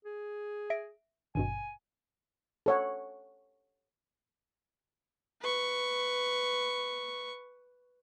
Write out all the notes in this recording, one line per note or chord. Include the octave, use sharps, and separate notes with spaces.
G#4
E5 A#6 D7
G#1 G2 B2 G#5
A4 C#5 F#5
B4 C#6